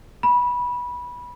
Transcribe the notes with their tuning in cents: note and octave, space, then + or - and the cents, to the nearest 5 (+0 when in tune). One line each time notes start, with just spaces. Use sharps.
B5 -15